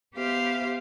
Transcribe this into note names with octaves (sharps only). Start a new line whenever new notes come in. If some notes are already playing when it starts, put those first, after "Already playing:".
B3 G4 C5 E5 F5